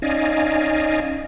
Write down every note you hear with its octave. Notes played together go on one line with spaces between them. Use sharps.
C#4 D#4 D5 D#5 F5 G#5